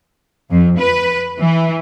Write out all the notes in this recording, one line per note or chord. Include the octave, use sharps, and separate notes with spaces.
F2
B4
E3